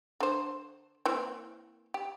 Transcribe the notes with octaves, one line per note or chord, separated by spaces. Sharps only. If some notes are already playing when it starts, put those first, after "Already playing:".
D3 C5
E3 A#3 C4
G4